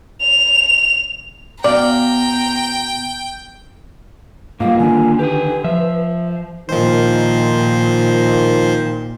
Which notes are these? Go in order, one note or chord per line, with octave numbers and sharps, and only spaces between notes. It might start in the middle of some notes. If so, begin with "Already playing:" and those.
F7
B2 D5 F5 G5 A#5
G#2 G3 A#3 F4 D#5 F5
D3 D#3 D4 G#5
G4 B4 G#5
F3 E5
A#2 D#3 F3 C5